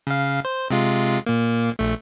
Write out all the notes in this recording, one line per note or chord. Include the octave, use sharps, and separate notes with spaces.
C#3 F5
C5
C3 G#3 F4
A#2 A#3
A#1 A3